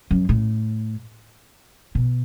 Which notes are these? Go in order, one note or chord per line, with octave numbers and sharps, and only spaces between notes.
F#2
A2
B2